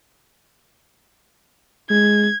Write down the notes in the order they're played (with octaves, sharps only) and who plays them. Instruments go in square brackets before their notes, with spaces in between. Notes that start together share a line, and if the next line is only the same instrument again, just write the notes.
[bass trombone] G#3 [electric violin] G#6